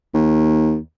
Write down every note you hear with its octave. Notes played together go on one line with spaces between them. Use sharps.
D#2